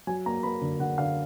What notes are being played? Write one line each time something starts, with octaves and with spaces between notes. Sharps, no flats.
F#3 G#5
A#3 A#5
A#3 B5
D3
D3 F#5
D3 F5